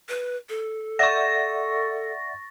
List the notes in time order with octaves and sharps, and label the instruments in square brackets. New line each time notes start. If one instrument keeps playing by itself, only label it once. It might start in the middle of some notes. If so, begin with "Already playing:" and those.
[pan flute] B4
A4
[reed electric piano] D5 E5 F#5 [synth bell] C#6 A6 A#6